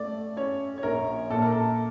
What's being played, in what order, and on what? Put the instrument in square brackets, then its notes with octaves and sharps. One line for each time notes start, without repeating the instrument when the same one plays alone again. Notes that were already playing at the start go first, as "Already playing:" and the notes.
Already playing: [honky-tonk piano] A3 [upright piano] D5
[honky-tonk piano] C#4 [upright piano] C#5
[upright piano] C#5
[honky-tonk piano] A#1 [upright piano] A#4
[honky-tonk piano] A#2 [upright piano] A4
[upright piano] A#4
A4